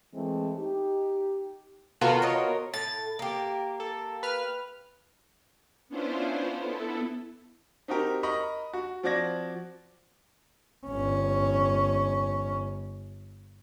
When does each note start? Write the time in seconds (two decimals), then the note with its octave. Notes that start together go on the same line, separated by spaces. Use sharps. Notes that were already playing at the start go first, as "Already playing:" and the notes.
0.13 E3 G#3 A3 C4
0.58 D#4 G4
2.01 C3 D#3 B3 F4 F#4 A4
2.22 A#4 C#5 D#5
2.74 A2 A6
3.19 A#3 G4
3.80 A4
4.23 B4 F6
5.89 B3 C#4 D4 E4 F4 C5
6.61 B3 E4 A4
7.88 C4 D#4 F#4 G4 A#4
8.23 A#4 D#5 A#5 B5 C#6
8.73 F#4
9.03 F3 C4 F#4 D5 G#6 A#6
10.87 G1 C#4